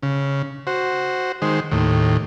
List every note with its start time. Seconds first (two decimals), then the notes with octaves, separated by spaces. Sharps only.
0.03 C#3
0.67 F#4 C5
1.42 D#3 G#3 C5
1.71 D#2 A2